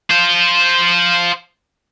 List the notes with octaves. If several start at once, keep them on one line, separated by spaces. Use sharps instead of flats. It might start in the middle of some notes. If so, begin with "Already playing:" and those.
F4 C5